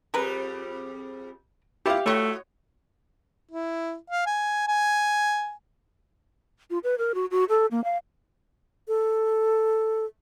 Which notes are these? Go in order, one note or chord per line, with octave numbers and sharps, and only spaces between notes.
F2 G3 G#4 A#4 B4
A3 E4 F4 G4 E5 F5
G3 A3 E4 F#4 C#5 D#5 C#6
E4
F5
G#5
G#5
F4
B4
A#4
F#4
F#4
A4
A#3
F5
A4